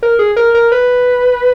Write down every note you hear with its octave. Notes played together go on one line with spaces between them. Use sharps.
A#4
G#4
A#4
A#4
B4